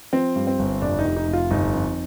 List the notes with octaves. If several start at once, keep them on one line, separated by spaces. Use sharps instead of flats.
F3 C4
G2
C4
G1
F1 D4
D#4
F1
D#4
F1
F4
G1 D#4
F2